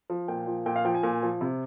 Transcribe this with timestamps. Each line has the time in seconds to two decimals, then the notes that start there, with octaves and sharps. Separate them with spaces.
0.10 F3
0.28 A#2 G5
0.47 F3
0.66 A#2 G5
0.76 F5
0.85 F3 G5
0.94 G#5
1.03 A#2
1.23 F3
1.41 C3